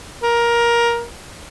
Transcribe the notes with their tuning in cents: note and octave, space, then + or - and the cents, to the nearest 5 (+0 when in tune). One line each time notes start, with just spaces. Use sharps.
A#4 +15